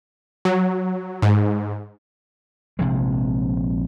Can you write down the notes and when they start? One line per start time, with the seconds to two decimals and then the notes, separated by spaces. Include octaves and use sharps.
0.45 F#3
1.22 G#2
2.79 A#1 C3 F3 G#3